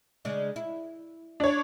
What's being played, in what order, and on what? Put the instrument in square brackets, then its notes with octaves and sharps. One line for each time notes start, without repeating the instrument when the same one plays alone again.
[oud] C#3 G#3 D4
E4
[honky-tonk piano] D4 C#5